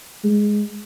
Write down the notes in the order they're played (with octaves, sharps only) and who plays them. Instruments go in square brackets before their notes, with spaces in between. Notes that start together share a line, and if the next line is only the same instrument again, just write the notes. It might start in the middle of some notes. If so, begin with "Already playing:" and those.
[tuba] G#3